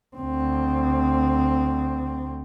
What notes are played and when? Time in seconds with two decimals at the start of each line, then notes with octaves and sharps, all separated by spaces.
0.17 D2 C4